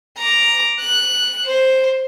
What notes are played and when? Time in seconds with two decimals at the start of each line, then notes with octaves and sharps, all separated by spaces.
0.18 A#5 D6
0.80 F#6
1.46 C5